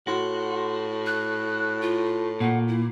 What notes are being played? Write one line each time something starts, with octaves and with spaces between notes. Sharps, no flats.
A2 F#4 C6
F#6
F4
A#2 F#5
E4